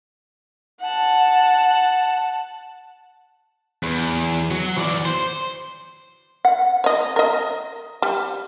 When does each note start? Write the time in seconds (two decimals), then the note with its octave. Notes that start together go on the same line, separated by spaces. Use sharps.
0.81 F#5 A5
3.83 E2
4.51 F#3
4.77 E3 D5
5.05 C5
6.45 F#5
6.84 C#5 D#5
7.16 A#4 D#5
8.02 G3